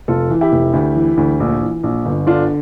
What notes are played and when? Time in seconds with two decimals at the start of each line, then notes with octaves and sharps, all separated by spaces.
0.08 F1 F4 A4
0.30 E3
0.41 E4 G4
0.52 F1
0.73 D2
0.95 E3
1.17 D2
1.40 A#1
1.61 E3
1.83 A#1
2.05 G1
2.27 D3 D4 F4